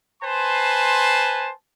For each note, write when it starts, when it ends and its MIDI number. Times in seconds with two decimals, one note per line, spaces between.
0.22 1.51 71
0.22 1.51 72
0.22 1.51 80
0.22 1.51 81
0.22 1.51 84